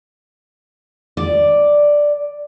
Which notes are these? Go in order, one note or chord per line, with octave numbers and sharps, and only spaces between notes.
D5